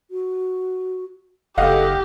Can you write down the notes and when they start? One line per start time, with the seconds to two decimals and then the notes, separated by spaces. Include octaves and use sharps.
0.11 F#4
1.58 F#1 G4 A4 D#5 F5 F#5